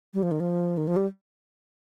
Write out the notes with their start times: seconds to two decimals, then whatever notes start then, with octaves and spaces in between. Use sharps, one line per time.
0.14 G3
0.23 F3
0.31 D#3
0.40 F3
0.77 D#3
0.87 F3
0.96 G3